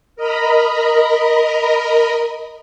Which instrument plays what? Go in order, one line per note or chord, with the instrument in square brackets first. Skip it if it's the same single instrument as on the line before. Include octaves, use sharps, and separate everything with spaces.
[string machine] A#4 D#5 A#5 B5